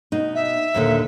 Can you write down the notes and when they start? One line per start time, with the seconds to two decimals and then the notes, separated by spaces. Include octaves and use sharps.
0.12 B2 D#4
0.35 E5
0.74 D#2 A#2 D3